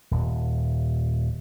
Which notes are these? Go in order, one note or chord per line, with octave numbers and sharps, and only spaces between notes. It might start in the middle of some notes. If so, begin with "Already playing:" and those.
D#1